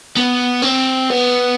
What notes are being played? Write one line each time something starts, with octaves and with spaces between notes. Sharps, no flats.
B3
C4
B3